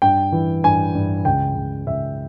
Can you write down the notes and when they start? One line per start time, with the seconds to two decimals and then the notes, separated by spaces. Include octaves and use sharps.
0.02 G2 G5
0.32 E3
0.64 G2 G#5
0.95 G2
1.25 C#2 G5
1.56 C#2
1.87 C#2 E5